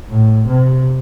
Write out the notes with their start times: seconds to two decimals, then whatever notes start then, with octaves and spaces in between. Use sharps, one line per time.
0.10 A2
0.48 C3